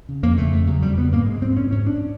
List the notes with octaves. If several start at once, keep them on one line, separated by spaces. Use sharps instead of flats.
C#3
F2 A#3
C#3 A3
F2
C#3 F#3
F2 G3
C#3 B3
G#2 A#3
G#3
G#2 C4
C#4
G#2 C#4
D4